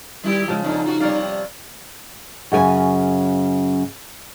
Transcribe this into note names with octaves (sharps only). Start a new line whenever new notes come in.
D#3 G3 E4 G4
C#3 F3 G#3
F2 G#2 D3 D#4
F4 F#4
C3 G3 C#5 D5 F5
F#2 C#3 A4 G#5